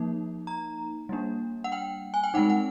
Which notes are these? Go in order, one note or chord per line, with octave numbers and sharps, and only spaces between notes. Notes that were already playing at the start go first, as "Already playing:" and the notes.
Already playing: F3 A#3 D#4
A#5
G3 A#3 D4
F#5
G5
G#5
G5
G#3 C4 D#4 F#5
F#5